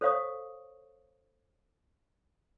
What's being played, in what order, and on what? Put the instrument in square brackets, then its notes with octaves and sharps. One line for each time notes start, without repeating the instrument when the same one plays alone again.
[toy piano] A4 C5 C#5 F5 C#6 D#6